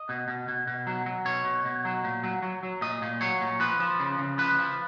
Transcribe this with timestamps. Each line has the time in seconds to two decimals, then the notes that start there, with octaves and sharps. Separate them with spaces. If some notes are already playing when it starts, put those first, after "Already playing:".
Already playing: D#5
0.09 B2
0.28 B2
0.48 B2
0.67 B2
0.87 F#3
1.06 F#3
1.25 B2 C#5
1.45 B2
1.65 B2
1.85 F#3
2.04 A#2
2.23 F#3
2.43 F#3
2.63 F#3
2.81 A#2 D#5
3.02 A#2
3.21 F#3 C#5
3.41 A#2
3.60 F3 B4
3.80 F3
4.00 C#3
4.18 C#3
4.38 F3 B4
4.59 F3